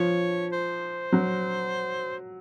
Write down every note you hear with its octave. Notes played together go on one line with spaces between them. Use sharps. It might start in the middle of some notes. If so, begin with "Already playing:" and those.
Already playing: F3 C#5
C5
F#3